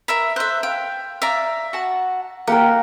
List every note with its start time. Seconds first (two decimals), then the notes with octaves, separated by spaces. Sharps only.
0.08 A#4 E5 B5
0.36 A4 C5 E5 F#6
0.63 F5 G5
1.22 D5 E5 F5 A#5
1.73 F#4 F#5 A5
2.47 A#3 G4 A#4 F#5 G5